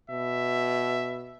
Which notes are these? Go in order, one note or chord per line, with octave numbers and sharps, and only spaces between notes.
B2 E5